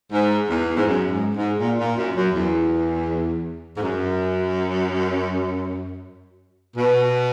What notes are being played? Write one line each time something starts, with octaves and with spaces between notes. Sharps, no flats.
G#2
E2
G#2
F#2
G#2
G#2
A#2
A#2
F#2
F#2
E2
G#2
F#2
B2